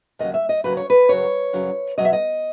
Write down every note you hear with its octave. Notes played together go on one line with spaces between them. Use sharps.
D#2 C#3 F#3 D#5
E5
D#5
D#2 C#3 F#3 B4
C#5
B4
F#2 C#3 F#3 C#5
F#2 C#3 F#3
E2 B2 F#3 D#5
E5
D#5